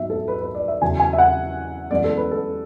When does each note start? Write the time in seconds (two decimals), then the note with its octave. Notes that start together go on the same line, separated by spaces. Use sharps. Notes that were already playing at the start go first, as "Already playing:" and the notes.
Already playing: G#2 F#3 B3 E5
0.10 A4
0.28 B4
0.41 B4
0.55 D5
0.68 E5
0.81 E2 C#3 F#3 G#5
1.00 G#5
1.13 E5
1.18 F#5
1.91 F#2 E3 G#3 B3 D5
2.04 A4
2.17 B4
2.31 A4